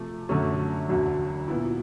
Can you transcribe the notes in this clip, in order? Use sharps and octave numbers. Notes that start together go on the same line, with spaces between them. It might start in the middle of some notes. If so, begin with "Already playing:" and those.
Already playing: C3 F3 A3
F#2 D3 F#3 A3 C#4
E1 D2 D3 F#3
A#2 F#3 B3 E4